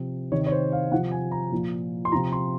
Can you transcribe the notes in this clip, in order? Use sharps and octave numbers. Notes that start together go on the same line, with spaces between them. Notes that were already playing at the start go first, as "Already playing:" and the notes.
Already playing: C3 F3
C3 D#3 C#5
C#5
C5
F5
C3 F3 F#5
G#5
A#5
A#2 F3
C6
C3 F3 A#5
C6